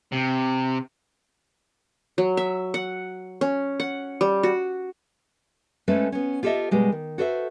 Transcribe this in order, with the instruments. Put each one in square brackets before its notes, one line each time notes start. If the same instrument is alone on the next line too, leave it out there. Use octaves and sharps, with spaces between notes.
[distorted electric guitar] C3
[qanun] F#3
E5
F#5
C#4
F#5
G3
F#4
[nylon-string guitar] G#3 A3 C#4 A4 B4 C5
B3 C#4
F4 G4 A4 A#4 D#5 E5
B2 G3 G#3 G4
D#3
F#4 A4 B4 C5 D5 E5